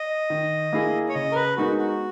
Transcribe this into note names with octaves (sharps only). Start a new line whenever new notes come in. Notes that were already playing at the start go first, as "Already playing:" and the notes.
Already playing: D#5
D#3
A#3 E4 G#4
C#5
C#3 D#5
A#4
B4
G#3 B3 D#4 F#4 A#4
F#4